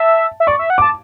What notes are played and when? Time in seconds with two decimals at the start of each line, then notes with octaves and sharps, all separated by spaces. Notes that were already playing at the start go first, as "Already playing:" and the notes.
Already playing: E5 A5
0.40 E5
0.47 D5 C#6
0.59 E5
0.70 F#5
0.78 A5 D6